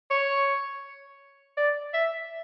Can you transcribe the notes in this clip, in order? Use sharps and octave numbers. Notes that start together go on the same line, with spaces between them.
C#5
D5
E5